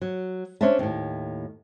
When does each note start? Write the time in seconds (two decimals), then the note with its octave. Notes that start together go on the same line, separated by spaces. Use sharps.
0.01 F#3
0.61 C#4 D4 C5 C#5 E5 A5
0.79 D#2 A2